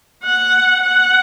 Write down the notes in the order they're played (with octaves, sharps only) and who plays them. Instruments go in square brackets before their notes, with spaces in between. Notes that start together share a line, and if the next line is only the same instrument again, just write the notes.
[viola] F#5
F#5